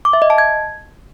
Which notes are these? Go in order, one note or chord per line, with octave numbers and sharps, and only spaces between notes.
D6
E5
D#5
A5
G#6